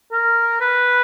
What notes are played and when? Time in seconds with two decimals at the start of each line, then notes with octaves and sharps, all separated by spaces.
0.12 A#4
0.61 B4